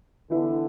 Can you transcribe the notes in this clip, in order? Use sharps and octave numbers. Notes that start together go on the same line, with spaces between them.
D3 E3 B3 E4